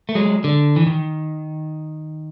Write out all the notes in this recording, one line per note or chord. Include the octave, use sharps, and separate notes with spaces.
A3
F#3 G#3
D3
E3
D#3